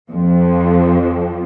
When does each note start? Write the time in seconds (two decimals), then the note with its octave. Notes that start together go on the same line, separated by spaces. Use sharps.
0.11 F2 F3